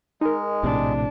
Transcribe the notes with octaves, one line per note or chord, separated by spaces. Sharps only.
G#3 D#4 A#4
A#1 A2 C3 D4